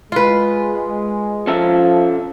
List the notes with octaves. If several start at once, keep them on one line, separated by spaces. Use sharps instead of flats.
G#3 F4 B4
F3 C#4 A4 E5